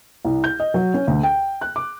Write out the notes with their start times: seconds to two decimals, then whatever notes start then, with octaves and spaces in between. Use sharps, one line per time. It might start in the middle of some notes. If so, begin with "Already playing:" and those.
0.25 C2
0.44 G6
0.60 D#5
0.74 F#3
0.94 C#4
1.07 D2
1.23 G5
1.61 F#6
1.76 D6